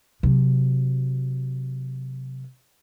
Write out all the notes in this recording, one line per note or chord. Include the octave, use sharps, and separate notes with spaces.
C3 F#3